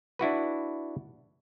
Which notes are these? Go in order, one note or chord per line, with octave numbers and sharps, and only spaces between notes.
D4 E4 F#4 B4